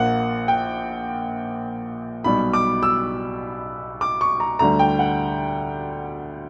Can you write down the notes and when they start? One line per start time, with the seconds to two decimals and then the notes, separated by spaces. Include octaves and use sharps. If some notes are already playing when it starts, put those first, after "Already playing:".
Already playing: A#1 A#2 A#3 F#5
0.48 G5
2.24 B1 B2 G3 B5
2.53 D6
2.83 E6
4.01 D6
4.21 C#6
4.40 A#5
4.59 D2 D3 G3 A#5
4.79 G5
4.99 F#5